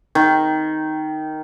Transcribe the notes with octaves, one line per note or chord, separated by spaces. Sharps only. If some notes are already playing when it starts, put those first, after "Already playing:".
D#3